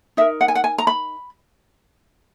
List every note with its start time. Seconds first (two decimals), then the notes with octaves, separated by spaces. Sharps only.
0.17 D#4 E5
0.21 A#4
0.41 F#5
0.48 G#5
0.55 F#5
0.64 G#5
0.78 A#5
0.87 B5